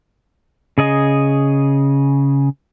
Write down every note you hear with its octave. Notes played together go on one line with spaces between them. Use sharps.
C#3 G#4 D#5 G#5